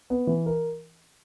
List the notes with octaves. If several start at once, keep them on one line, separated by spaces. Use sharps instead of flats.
B3
E3
A#4